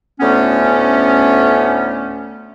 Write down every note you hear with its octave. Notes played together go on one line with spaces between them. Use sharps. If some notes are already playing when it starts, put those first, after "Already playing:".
D2 A2 A3 B3 C#4